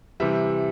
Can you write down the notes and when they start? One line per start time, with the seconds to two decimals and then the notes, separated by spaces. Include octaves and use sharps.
0.20 C3 E3 G3 E5